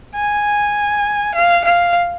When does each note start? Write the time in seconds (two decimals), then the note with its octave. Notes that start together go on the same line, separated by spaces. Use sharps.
0.15 G#5
1.35 F5
1.64 F5